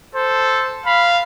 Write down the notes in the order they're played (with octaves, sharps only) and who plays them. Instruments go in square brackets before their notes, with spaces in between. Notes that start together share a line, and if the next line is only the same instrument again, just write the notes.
[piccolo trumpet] A4 [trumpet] C5
[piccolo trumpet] F5 [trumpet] B5